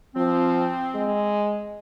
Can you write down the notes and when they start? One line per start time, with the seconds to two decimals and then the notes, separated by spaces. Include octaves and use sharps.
0.16 F3 C4
0.95 G#3